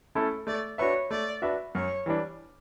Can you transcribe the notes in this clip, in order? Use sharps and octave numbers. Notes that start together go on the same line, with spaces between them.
A3 C#4 E4 A4
A3 D5
D4 F#4 B4 C#5 E5
A3 D5
D4 F#4 B4 E5
F#2 C#5
E3 G3 D4